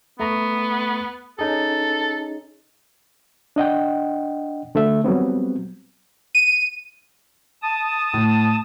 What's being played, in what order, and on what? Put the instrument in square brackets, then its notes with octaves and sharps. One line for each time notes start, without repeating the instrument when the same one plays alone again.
[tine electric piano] A3 A#5 C#6 [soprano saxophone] B3
[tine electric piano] C#4 D#4 G#4 [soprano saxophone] A4
[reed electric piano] D4 D#5 F#5 G5
D3 A3 A4 E5
F#3 G3 B3 C4
[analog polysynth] D#7
[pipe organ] A5 D#6
[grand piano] A2